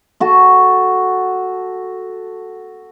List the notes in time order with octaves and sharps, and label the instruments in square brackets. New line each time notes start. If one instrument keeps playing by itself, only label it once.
[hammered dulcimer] F#4 A4